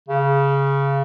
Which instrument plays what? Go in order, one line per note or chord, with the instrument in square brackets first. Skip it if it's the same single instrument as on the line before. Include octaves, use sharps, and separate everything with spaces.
[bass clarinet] C#3